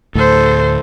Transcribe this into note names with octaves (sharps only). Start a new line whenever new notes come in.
D2 A2 A4 C5